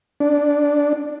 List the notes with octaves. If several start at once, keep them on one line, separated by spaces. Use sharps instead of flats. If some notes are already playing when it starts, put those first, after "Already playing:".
D4